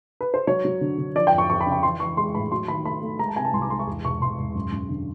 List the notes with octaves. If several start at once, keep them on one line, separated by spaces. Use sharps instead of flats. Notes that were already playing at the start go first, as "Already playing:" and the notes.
B4
C5
F#3 C#5
F#3
D3
D3
F3 D5
G5
F2
C#6
F2 C#6
B5
C#3
B5
E3 C6
E3 C#6
G#3 C6
A2 B5
F#3 C6
D#3 B5
A3 B5
A3
G#3 A#5
A5
C3 G#5
A5
C2 C6
D6
G#3 C6
C#6
E2
E1 C#6
E1 C6
E1
F#2
F#2
D3